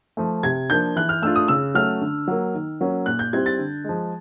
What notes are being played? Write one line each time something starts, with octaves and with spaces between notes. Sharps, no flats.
F3 A3
C3 G#6
F3 A#3 D4 G6
E3 F#6
F6
A3 D4 F4 E6
D#6
C#3 E6
F#3 A3 C#4 F6
D3
F#3 A#3
D#3
F#3 A#3 C#4
A#2 F#6
G6
G3 C4 E4 G#6
A6
D3
F3 G#3